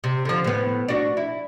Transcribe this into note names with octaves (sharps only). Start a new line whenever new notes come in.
C3
D3 F3
A2 B3
D4 F#4
E4